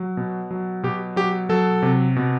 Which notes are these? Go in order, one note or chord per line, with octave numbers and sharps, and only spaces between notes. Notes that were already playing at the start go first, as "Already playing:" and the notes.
Already playing: F#3
B2
F#3
B2 G4
F#3 G4
F#3 A4
C3
B2